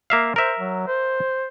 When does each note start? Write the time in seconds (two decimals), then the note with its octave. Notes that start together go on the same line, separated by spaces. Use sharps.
0.10 A#3 E5 F5
0.36 A#4 C5 E5
0.59 F#3
0.87 C5